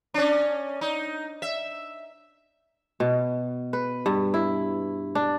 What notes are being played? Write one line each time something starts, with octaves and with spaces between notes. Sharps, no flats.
C#4 D4
D#4
E5
B2
B4
G2
E4
D4